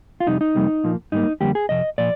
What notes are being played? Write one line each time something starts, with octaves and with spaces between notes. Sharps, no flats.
F4
F2 C3 G3 D#4
D#4
F2 C3 G3 A#3
A#2 F3 A#3
G#2 G3 A#3 D#4
F2 D3 G3 A#3 G4
G#4
F2 C3 D#5
A#2 F3 D5